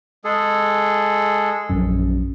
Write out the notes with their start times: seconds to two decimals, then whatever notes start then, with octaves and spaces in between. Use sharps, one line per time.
0.24 G#3 G#4 A4
1.70 A#1 F#2